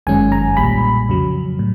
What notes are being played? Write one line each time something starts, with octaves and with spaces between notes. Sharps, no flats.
G1 F#2 D#3 G#3 C#4 G#5
A#5
B1 A#2 G3 B5
F2 C#3 F#3
A2